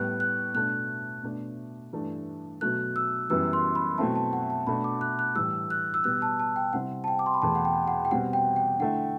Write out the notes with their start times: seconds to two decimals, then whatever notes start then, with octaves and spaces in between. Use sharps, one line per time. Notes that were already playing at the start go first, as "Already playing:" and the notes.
Already playing: A2 G3 B3 F#6
0.20 F#6
0.54 B2 A3 D4 F#6
1.23 B2 A3 D4
1.93 G2 E3 A3 D4
2.61 B2 F#3 A3 F#6
2.96 E6
3.30 F#2 E3 G3 B3 E6
3.53 C6
3.75 B5
3.98 B2 F#3 A3 C4 E4 A5
4.15 A5
4.33 F#5
4.50 A5
4.67 B2 A3 D4 B5
4.84 D6
5.01 F#6
5.19 F#6
5.35 A2 E3 G3 E6
5.70 F#6
5.94 E6
6.04 B2 G3 B3 F#6
6.22 A5
6.40 A5
6.56 G5
6.73 C3 G3 C4 E4 F#5
7.04 A5
7.08 G5
7.19 D6
7.26 C6
7.34 B5
7.42 E2 B2 A3 A5
7.55 F#5
7.65 G5
7.88 F#5
8.05 G5
8.11 B2 G3 C4 F#5
8.33 G5
8.56 G5
8.79 D3 A3 E4 F#5